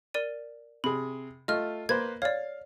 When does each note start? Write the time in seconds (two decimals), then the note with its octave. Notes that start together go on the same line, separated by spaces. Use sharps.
0.14 A#4 D5 D#7
0.84 C3 G#4 B5
1.48 A3 F4 D#5 F6
1.89 A#3 B4 C5 G#6
2.22 C#5 D5 F5